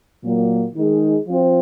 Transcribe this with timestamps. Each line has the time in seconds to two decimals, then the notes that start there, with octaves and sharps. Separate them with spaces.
0.24 A#2 F#3 A#3
0.75 D#3 G#3 D#4 G#4
1.28 F3 C4 F4